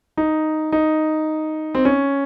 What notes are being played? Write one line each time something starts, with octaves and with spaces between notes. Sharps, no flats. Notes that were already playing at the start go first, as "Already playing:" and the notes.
D#4
D#4
C4
C#4